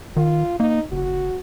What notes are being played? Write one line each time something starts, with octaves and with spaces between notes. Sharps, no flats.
D#3 F4
A#3 D#4
F#1 F#4